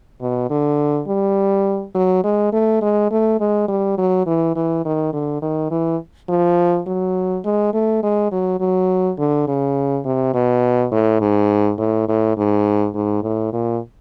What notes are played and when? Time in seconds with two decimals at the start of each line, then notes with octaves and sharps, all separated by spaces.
0.21 B2
0.50 D3
1.08 G3
1.95 F#3
2.24 G#3
2.53 A3
2.82 G#3
3.11 A3
3.40 G#3
3.68 G3
3.98 F#3
4.26 E3
4.56 E3
4.85 D#3
5.13 D3
5.42 D#3
5.71 E3
6.29 F3
6.87 F#3
7.45 G#3
7.74 A3
8.03 G#3
8.32 F#3
8.60 F#3
9.18 D3
9.47 C#3
10.05 C3
10.34 B2
10.92 A2
11.21 G#2
11.79 A2
12.08 A2
12.37 G#2
12.95 G#2
13.23 A2
13.53 A#2